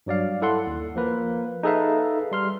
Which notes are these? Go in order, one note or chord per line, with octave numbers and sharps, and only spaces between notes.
G2 F#3 D5 F5
E4 A4 F#5 C6
D#2
F3 A#3 B4
D#4 G#4 A4 B4 E5 F5
G3 C6 F6